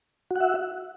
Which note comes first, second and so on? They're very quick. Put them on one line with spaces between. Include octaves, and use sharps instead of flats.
F#4 F#5 E5